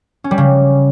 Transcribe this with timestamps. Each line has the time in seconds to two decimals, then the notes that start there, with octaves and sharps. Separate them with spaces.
0.24 C#4
0.31 G3
0.38 C#3